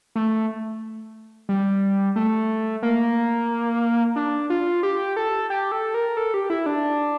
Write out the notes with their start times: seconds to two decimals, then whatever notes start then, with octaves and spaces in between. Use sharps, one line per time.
0.15 A3
1.49 G3
2.16 A3
2.83 A#3
4.16 D4
4.50 F4
4.83 G4
5.16 A4
5.50 G4
5.72 A4
5.94 A#4
6.17 A4
6.34 G4
6.50 E4
6.66 D4